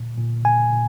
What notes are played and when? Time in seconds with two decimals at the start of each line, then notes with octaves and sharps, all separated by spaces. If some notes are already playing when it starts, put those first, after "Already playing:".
Already playing: A#2
0.17 A#2
0.45 A#2 G#5
0.73 A#2